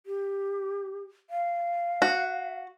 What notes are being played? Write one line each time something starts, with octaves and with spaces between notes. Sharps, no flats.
G4
F5
F#4